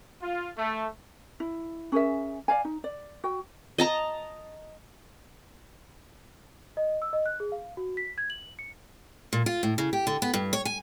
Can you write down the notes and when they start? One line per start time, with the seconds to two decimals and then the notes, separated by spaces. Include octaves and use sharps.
0.21 F4
0.58 A3
1.40 E4
1.92 C#4 G#4 A#4 E5
2.48 D5 F5 G#5
2.65 D#4
2.84 D5
3.24 F#4 G5
3.78 D#5 A5 A#5
6.77 D#5
7.02 E6
7.13 D#5
7.26 F#6
7.40 G#4
7.52 F5
7.77 F#4
7.97 B6
8.18 G#6
8.30 F#7
8.59 C#7
9.33 A#2
9.46 F4
9.63 A2
9.78 C#3
9.93 G4
10.07 D3
10.22 B3
10.34 G2
10.53 C#5
10.65 G#5